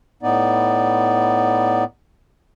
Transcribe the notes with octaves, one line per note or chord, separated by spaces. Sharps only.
A2 B3 D#4 D5